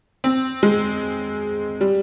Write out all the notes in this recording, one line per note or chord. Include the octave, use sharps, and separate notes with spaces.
C4
G#3
G3